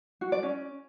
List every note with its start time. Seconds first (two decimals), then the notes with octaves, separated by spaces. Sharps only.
0.21 F#4
0.32 D5
0.43 C#4